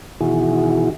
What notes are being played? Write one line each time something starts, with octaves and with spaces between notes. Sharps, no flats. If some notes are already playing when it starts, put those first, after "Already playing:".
B2 D#3 E3 E4 F#4 G#4